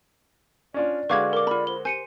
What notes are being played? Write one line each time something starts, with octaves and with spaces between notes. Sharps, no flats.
C#4 D4 F4 D5
D3 G#3 F#4 B4 F5 C#6 D6 G#6
A#4 D6
F4 B5
C5 G7
G4 C5 G#5 C#7 D#7